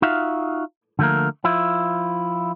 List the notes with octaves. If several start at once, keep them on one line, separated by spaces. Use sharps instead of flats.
D#4 F4 F#4 E5 F5
D3 F3 A3 A#3 A#4
F3 E4 F4